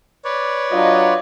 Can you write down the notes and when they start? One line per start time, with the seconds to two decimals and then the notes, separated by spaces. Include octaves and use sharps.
0.25 B4 C#5 D5
0.72 F#3 D4 F4 D#5